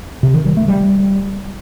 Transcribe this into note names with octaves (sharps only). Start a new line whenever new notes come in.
C3
D#3
G3
A3
G3